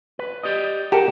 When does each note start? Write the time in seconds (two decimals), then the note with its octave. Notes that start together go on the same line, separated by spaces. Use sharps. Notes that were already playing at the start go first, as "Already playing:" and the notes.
0.19 B4
0.43 G4 D5 D#5
0.92 G4 A#4 F#5 A5